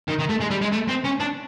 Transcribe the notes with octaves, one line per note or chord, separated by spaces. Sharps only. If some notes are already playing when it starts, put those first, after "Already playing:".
D#3
D#3
A3
G#3
G3
G#3
A3
C4
C#4
D4